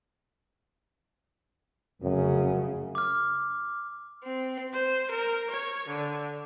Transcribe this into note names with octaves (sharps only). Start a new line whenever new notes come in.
F1 F#2 C#3
D6 F6
C4
C5
A#4
C#5
D3